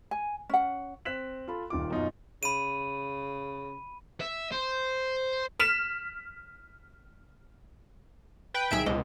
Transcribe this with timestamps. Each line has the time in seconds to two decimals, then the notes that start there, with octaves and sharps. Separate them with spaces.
0.11 G#5
0.49 C#4 F#5
1.05 C4 F#6 B6 E7 F#7
1.48 F4 A4 B5
1.70 D#1 D#3 F4 D6
1.91 F#2 B2 D#4 F4
2.43 C#3 B5 D#7
4.21 E5
4.52 C5
5.60 F6 B6 E7
8.54 B4 G5
8.71 C2 D#3 G#4 E5 D7
8.86 C#2 B2 C5 D#5